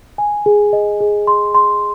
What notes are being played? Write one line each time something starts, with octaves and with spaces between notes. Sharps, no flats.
G#5
G#4
D#5
G#4
C6
C6